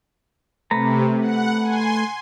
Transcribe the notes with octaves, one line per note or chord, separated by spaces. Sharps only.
C3 A3 B4 A#5
F#5
G#5 C6